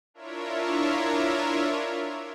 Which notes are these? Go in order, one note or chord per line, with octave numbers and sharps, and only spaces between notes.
D4 E4 F4 A#4 C#5 E5